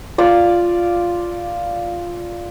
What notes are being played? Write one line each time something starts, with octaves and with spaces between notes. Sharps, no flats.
F4 D5